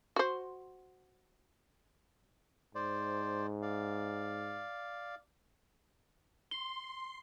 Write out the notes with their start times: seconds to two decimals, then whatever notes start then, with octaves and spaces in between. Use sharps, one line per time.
0.16 F#4 C5
2.75 G#2 C5 D5
3.62 D5 F5
6.51 C6 G7